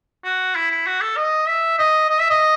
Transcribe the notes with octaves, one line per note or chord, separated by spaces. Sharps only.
F#4
E4
E4
F#4
A4
D#5
E5
D#5
D#5
E5
D#5